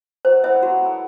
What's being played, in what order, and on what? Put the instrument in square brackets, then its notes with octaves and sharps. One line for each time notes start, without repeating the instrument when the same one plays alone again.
[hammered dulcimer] F#3 [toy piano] C5
[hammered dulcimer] B3 E4 A4 [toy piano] C5 E5
[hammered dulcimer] F#3 [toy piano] F#4
[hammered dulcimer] B3 E4 A4